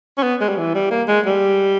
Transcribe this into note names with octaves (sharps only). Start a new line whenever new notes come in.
C#4
B3
G#3
G3
E3
G3
A#3
G#3
G3